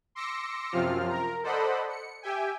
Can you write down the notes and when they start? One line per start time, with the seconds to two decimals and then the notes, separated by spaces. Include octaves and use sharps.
0.15 C6 D6 E6 A#6 C#7
0.72 F#2 C3 F3 C4 F4 F6
1.08 A#4 A#5
1.43 A4 C5 D5 D#5 F#5 B5
1.89 C#7
2.22 G4 E5 G5 G#5